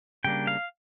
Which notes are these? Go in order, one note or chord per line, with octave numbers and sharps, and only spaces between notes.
C#3 G3 A#3 D4 G5
F5